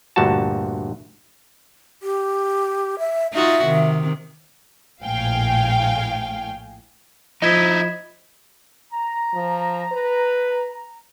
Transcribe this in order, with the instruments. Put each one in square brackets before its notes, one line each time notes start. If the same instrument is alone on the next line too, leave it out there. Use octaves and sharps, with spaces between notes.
[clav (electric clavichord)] D2 G2 A#2 F#4 A5
[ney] G4
E5
[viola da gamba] D#4 F4 F#4 [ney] E5
[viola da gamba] C3 D#3
[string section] A#1 A2 F5 G5 G#5
[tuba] F3 [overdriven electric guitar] D#4 E4 [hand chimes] D#5 G#6 B6
[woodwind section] A#5
[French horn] F3
B4